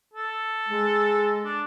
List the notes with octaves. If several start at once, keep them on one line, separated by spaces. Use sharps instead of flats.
A4
G#3
D4